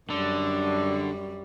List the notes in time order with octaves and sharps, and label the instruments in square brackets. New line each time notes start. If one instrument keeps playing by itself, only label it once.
[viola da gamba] F#2 G3 [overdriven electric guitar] D3